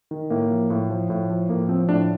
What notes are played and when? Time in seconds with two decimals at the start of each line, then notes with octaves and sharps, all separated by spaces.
0.11 D#3
0.30 A2 A#3
0.51 F3
0.70 A2
0.90 F3
1.10 A2
1.30 F3
1.49 A2 A#3
1.69 F3 C4
1.89 A2 D4